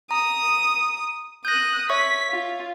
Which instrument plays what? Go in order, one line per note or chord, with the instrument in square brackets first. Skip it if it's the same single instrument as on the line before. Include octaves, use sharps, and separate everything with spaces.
[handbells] A#5 [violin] D#6
[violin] D#6 F#6 [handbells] G6 A#6
[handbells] C#5 E5 C#6 [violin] B6
[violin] F4